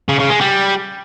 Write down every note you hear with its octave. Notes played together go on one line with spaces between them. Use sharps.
C#3
C#3
G#3
G3